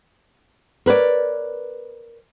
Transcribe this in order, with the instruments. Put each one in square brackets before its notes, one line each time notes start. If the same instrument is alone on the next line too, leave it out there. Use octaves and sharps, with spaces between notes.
[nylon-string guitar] A#4 B4 C#5 D5